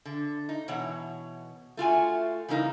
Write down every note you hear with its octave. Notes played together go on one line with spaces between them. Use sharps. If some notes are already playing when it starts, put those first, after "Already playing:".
D3
D#4
B2 E3 C#5 F#5
A3 F4 F#4 G#5
C#3 E3 G3 A#3 D#4